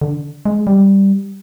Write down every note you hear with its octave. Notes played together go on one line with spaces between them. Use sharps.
D3
G#3
G3